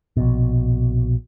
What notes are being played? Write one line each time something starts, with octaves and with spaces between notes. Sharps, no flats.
A#1 B2